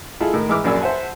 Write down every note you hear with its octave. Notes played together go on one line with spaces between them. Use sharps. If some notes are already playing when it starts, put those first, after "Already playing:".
G#3 E4 F4 G#4 A4
A2 D#3
G#2 E3 E5 D6 F6
A#1 F#2 D5 G#5 E6
C5 E5 F#5 G#5 A5